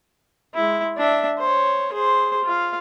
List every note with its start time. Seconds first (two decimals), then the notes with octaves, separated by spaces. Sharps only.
0.54 G#3 E4
0.97 D4 E5
1.38 C5 C#5
1.93 G#4 C5
2.44 F4 F5